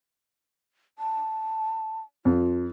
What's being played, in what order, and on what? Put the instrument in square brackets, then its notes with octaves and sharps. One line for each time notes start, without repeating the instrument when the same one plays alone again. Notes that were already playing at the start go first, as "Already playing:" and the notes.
[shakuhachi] A5
[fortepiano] F2 [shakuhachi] F4